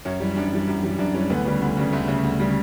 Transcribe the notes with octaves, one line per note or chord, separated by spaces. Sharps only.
F#2 C#4
E3 G3
F#2 D4
E3 G3
F#2
E3 G3
F#2 D4
E3 G3 C#4
D2 B3
C#3 G3
D2
C#3 G3
D2 A3
C#3 G3
D2
C#3 G3